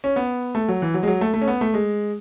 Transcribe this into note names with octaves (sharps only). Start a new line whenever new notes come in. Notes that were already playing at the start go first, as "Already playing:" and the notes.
C#4
B3
A3
F#3
E3
F#3
G#3
F#3
A3
A3
C#4
B3
A3
G#3